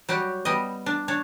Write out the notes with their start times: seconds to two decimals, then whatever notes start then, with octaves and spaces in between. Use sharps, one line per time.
0.09 F#3 G3 F#4 G4
0.45 G3 B3 D#5
0.86 D4
1.08 D4 C#5